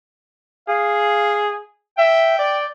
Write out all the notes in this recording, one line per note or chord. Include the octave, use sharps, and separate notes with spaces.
G#4 F5
E5 G5
D5